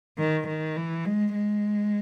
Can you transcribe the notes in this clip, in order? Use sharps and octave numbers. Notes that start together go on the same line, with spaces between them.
D#3
D#3
E3
G#3
G#3